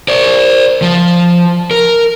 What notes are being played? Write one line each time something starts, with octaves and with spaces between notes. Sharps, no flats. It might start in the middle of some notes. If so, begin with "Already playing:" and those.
C5 D5
F3
A#4